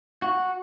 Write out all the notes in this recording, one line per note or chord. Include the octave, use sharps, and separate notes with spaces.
F#4